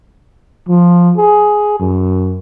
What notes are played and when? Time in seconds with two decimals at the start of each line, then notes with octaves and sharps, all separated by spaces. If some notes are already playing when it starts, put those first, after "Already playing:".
0.68 F3
1.18 G#4
1.80 F#2